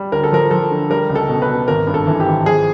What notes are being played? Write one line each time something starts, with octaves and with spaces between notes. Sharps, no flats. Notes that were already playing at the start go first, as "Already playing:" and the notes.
Already playing: G3
D2 A#4
A4
F3 A#4
F3 A4
D3
G3 A#4
C#2
A4
B2
B4
B2
G#1 A#4
G2
A4
E3
G4
G#1
F3 G#4